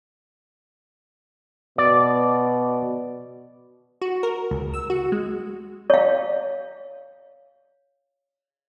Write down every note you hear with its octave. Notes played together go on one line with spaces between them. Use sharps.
B2 D5
F#4
A#4
C#2
E6
F#4
G#3
C#5 F5